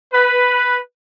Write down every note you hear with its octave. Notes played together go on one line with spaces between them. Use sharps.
B4